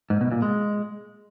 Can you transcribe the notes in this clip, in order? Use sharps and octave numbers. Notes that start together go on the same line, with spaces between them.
G#2
B2
A#2
G#3